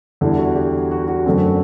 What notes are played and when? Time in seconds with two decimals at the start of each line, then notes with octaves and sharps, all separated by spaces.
0.21 E2 D3 G3 E4
0.38 F#4
0.56 G4
0.91 F#4
1.08 F#4
1.26 F#2 D3 A3 C4